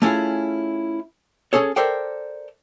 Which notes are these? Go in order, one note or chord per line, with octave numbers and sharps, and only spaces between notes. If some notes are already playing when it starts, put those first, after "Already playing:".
A3 C#4 E4 F4 G#4
C#4 G#4 A4 C#5
A4 A#4 C5 D5 E5 G5